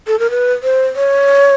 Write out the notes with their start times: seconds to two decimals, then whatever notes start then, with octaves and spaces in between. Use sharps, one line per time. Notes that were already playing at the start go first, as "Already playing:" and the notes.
0.07 A4
0.19 A#4
0.30 B4
0.63 C5
0.96 C#5